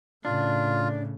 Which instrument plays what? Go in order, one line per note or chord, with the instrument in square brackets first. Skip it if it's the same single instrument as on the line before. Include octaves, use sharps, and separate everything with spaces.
[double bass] A2 C#3 [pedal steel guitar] D4 [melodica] F4